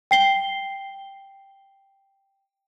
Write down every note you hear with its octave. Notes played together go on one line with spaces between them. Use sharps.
G5 C7 G7